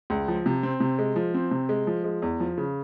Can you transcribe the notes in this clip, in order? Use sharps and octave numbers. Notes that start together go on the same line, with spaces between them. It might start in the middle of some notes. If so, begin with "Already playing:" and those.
C#2
F3
C3
C4
C3
G#3
F3
C4
C3
G#3
F3
G#3
E2
F3
C#3